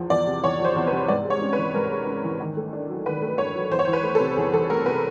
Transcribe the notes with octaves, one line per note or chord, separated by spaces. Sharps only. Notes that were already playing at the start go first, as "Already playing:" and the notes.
Already playing: E2 F3
E2 D5
C3
E2 C#5
F3 C5
E2
B4
C3
G#2 D5
G#3
C#5
C#4
B4
E3
G#2 A#4
G#3
C#4
E3
D#3
A3
D4
F#3
D#3 B4
A3
D4 C#5
F#3
E2 C5
C#5
E3 C5
B4
A3
A4
C3
E2 G#4
E3 A4
A3 A#4
C3 B4